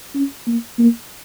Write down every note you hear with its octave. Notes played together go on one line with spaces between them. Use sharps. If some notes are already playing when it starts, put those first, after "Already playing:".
C#4
A#3
A#3